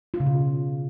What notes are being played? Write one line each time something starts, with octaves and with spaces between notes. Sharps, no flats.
F4
C#3
B2